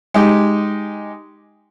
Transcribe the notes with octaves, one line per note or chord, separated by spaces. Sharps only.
G#3 D#4 G4